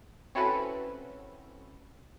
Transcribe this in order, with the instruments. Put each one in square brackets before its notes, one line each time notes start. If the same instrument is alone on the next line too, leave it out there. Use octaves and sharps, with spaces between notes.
[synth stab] C4 C#4 E4 F#4 A4 B4